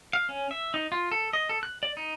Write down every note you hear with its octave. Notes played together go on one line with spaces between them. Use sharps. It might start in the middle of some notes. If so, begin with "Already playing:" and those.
F5
C#4
E5
D#4
F4
A4
D#5
A4
F#6
D5
D#4